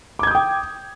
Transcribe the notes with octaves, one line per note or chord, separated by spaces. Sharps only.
G5 D6 D#6 G6 G#6